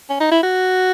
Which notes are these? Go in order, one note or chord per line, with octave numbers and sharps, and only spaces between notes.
C#4
D#4
E4
F#4